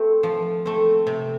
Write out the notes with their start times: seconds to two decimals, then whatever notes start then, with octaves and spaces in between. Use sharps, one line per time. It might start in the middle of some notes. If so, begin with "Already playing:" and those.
Already playing: A3 C4
0.23 F3
0.65 A3 C4
1.07 C3